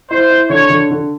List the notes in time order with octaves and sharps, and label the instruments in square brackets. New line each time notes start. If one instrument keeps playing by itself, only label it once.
[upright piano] E4 [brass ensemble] C5
[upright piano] E4
[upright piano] D3 [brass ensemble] C#5
[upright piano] D3
D3